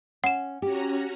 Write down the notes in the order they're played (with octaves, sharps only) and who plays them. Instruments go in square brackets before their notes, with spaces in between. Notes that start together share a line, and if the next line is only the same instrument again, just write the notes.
[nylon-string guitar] C#4 [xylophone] F#5 E7
[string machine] C#4 F#4 A#5 [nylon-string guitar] G4